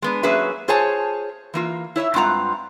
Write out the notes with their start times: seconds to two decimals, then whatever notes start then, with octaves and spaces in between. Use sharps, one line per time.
0.02 G#3 B3 D4
0.23 F#3 A#3 C#4 G#4 B4 E5
0.68 F4 G#4 C5 C#5 G#5 A5
1.54 E3 A#3 F4
1.96 E4 C#5 D#5 E5
2.14 G2 G#3 C4 F4 F#5 A#5